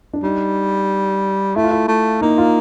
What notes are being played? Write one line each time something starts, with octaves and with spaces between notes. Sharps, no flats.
D4
G3 D#4
A3 E4
F4
E4
A3
A#3 D#4
F4